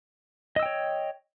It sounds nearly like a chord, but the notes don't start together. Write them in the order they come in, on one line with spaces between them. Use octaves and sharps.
D#5 E6 G5 C#5